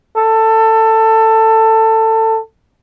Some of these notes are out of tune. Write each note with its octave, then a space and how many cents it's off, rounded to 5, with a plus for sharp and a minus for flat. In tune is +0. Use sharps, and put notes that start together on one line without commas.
A4 +20